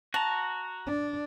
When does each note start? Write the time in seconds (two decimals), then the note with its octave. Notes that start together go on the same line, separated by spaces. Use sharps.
0.14 F#4 A5 A#5
0.86 D4